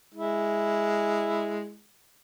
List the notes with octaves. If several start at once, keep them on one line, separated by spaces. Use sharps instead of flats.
G#3 E4